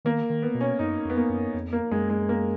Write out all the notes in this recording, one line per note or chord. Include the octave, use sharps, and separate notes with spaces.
D#3 A#3
D#3
B3
B2
C#4
F#2 D#4
F2 B3
A#3
F#2
F2
A#3
F#2 G#3
G#3
A#3